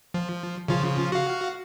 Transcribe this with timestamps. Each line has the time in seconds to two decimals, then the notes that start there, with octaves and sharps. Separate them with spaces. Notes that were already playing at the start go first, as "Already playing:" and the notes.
0.14 F3
0.68 C#3 F3 F4
1.12 F#4 F5